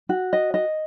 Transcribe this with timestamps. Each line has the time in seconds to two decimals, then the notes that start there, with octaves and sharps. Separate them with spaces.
0.09 F#4
0.33 D#5
0.54 D#5